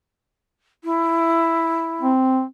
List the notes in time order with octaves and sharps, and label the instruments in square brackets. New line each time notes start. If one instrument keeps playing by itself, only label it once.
[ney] E4
[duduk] C4